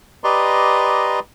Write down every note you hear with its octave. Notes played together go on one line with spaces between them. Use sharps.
G4 B4 D5 D#5 A#5 C6